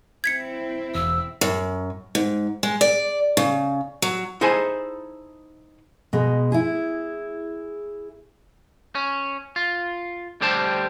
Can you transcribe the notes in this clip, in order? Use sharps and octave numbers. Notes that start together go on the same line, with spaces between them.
C4 E4 G#6 B6 C#7
E1 E6
F#2
G#2
G#3
D5
C#3
F#3
D#4 E4 G#4 A4 C5 G#5
B2 G#3
E4 G#4
C#4
F4
D2 D3 G3 G4 C5 A5